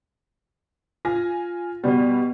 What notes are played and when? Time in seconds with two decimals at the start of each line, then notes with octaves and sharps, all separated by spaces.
1.05 F4 G#5 A#6
1.84 B2 G3 B3 F#4